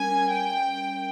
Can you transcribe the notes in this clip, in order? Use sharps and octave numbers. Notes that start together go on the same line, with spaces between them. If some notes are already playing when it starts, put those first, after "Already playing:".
Already playing: G3 C#4 A#4 G#5
G5